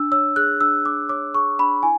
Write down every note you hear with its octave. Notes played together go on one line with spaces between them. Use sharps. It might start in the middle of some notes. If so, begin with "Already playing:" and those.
Already playing: D4 E6
C#5 E6
G#4 F#6
D4 E6
D4 D6
C#5 D6
G#4 C#6
D4 B5
E4 G#5